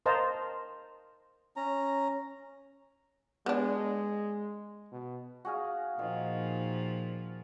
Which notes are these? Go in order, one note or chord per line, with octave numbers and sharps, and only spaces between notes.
A#4 C5 D#5 F5 A5 A#5
C#4 A#5
G#3 B3 D4
B2
F#4 G#4 F5
A#2 D#3 F3